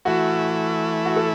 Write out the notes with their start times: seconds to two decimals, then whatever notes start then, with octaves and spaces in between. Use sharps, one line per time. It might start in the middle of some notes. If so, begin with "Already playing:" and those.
0.05 E3 A3 E4 F#4
1.05 F#4
1.16 A4